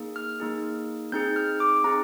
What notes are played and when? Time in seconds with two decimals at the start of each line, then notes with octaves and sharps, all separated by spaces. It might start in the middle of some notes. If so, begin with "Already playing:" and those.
Already playing: A#3 D#4 G#4
0.16 F6
0.40 A#3 D#4 G#4
1.12 C4 D#4 G#4 G6
1.36 F6
1.60 D6
1.84 C4 D#4 G#4 A#5